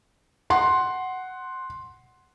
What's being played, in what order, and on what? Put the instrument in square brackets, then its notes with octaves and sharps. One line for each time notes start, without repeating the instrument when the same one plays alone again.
[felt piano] F#5 C6